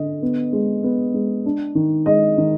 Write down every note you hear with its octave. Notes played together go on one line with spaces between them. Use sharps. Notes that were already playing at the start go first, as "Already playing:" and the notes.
Already playing: D3 D#5
B3
G#3
B3
G#3
D4
D#3
G#3 D#5
D#3